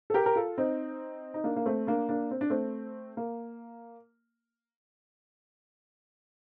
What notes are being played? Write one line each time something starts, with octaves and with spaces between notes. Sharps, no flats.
A4
G4 A#4
A#4
F4 A4
C4 D#4
D#4
A#3 D4
A#3
A3 C4
A#3 D4
A#3 D4
C4
D4
A3 C4
A#3